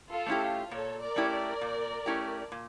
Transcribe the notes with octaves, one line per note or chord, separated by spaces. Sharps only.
F4 A4
A3 C#4 E4 G4
F4
A#2 A4 C#5
A#4 D5
A3 C#4 E4 G4
A#4 D5
A#2
A3 C#4 E4 G4
A#2